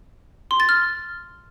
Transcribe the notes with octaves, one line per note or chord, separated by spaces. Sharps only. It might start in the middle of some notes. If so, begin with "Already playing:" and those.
C6
A6
F6